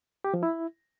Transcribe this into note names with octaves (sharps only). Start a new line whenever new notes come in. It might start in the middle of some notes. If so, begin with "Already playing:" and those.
G4
F3
E4